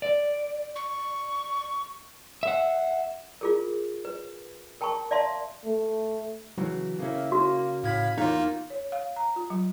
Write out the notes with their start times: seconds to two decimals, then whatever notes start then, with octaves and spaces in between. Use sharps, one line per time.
0.02 D5
0.75 C#6
2.43 E5 F#5
3.41 F4 G#4 A#4
4.05 B4
4.81 A#4 G5 A5 B5 C#6
5.11 D5 E5 F5 A5 C6
5.65 A3
6.58 C#3 E3 F#3
6.99 C#3 A#3 C#4 E4
7.32 A#3 F#4
7.84 A2 F5 B5 G#6
8.18 E2 A#3 D#4 F4 C#5 F5
8.70 C#5
8.92 F5
9.16 A#5
9.36 F4
9.50 F#3